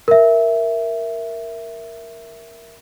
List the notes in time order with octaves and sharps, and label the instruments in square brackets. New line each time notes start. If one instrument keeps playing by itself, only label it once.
[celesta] A#4 E5